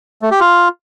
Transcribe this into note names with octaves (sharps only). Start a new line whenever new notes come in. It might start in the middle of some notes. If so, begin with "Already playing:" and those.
A3
G4
F4